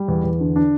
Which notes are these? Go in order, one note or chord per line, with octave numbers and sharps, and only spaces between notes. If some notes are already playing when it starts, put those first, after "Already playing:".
Already playing: G3
E2
E2
D3
D4